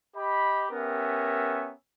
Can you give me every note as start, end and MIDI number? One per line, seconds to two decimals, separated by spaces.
0.16 0.66 67
0.16 0.66 75
0.16 0.66 83
0.71 1.71 59
0.71 1.71 61
0.71 1.71 67
0.71 1.71 70
0.71 1.71 76